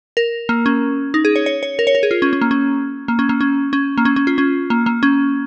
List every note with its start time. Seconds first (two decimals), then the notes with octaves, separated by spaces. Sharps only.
0.17 A#4
0.49 A#3
0.66 C#4
1.14 D#4
1.25 G#4
1.36 C#5
1.46 C#5
1.63 C#5
1.79 A#4
1.87 C#5
1.95 A#4
2.03 G#4
2.11 F4
2.22 C#4
2.33 C#4
2.41 A#3
2.51 C#4
3.08 A#3
3.19 C#4
3.29 A#3
3.41 C#4
3.73 C#4
3.98 A#3
4.05 C#4
4.16 C#4
4.27 F4
4.38 C#4
4.70 A#3
4.86 A#3
5.03 C#4